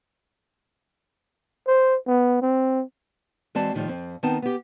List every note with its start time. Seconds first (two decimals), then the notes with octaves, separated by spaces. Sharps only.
1.67 C5
2.07 B3
2.42 C4
3.55 E3 G#3 C4 F#4 D5 A5
3.74 A2 D#3 F3 G3
3.88 F2 C4
4.23 D#3 B3 C4 D#4 A5
4.42 B3 G4